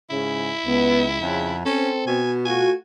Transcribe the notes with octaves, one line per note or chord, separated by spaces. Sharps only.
G#2 C#3 E4
C#2 B3
F2 C#3
C4 C#4 A4
B2 G#5
A3 F4 F#4 G#5